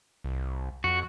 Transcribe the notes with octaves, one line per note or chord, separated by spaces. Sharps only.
C2
F2 F#4